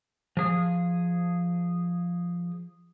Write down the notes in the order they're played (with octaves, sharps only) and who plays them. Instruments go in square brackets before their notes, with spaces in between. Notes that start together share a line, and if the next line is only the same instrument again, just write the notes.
[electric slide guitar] F3 G#4